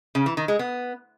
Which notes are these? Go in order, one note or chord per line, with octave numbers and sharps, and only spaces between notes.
C#3
E3
D#3
G#3
B3